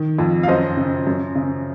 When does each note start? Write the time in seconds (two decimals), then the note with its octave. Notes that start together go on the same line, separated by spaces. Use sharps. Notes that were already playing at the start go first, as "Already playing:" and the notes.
Already playing: D#3
0.19 F2
0.43 F5
0.48 F#2 C5 D#5
0.77 C#3
1.07 F#2
1.35 C#3